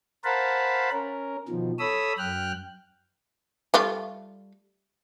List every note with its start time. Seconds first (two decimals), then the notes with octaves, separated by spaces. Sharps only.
0.24 A#4 C5 F5 F#5 A5 B5
0.92 C#4 A#4
1.49 B2 D#3 F3
1.79 A4 C#5 B5 D#6 E6
2.18 F#2 G5 F6 F#6
3.74 G3 A3 F4